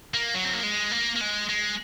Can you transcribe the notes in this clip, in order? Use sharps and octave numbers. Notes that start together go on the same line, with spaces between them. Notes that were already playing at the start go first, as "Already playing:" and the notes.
A#3
F#3
C4
A#3
G#3
A#3
A#3
G#3
G#3